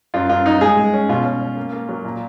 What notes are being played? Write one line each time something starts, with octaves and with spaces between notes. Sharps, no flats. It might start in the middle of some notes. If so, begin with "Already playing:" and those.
F#2 F4
F#2 F4
F#2 D#4
G#3 G#4
G#3
C#4
B2 F4
C#4
C#4
A#3
A#3
F#3
A#2